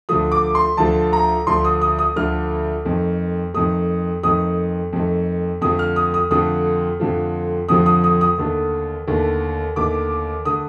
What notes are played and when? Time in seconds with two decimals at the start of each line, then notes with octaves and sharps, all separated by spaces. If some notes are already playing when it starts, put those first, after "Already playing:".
0.09 D2 D3 F3 A3 D#6
0.32 D6
0.55 C6
0.77 D2 D3 F3 A3 A5
1.13 A#5
1.47 D2 D3 F3 A3 C6
1.65 D#6
1.81 D#6
1.99 D#6
2.16 D2 D3 F3 A3 F6
2.85 F2 D#3 A3
3.54 F2 D#3 A3 D#6
4.23 F2 D#3 A3 D#6
4.93 F2 D#3 A3
5.61 F2 D3 F3 A3 D#6
5.79 F6
5.96 D#6
6.14 D#6
6.31 F2 D3 F3 A3 D#6
7.00 F2 D3 F3 A3
7.69 F2 D3 F3 A3 D#6
7.86 D#6
8.04 D#6
8.21 D#6
8.38 D#2 D3 A3
9.07 D#2 D3 A3
9.76 D#2 D3 A3 D6
10.45 D3 A3 D#6